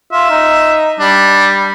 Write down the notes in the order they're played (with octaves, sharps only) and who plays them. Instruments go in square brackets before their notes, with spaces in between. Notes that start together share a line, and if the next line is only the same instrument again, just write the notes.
[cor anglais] F4 [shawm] E5
[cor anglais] D#4
[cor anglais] G3 [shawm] D4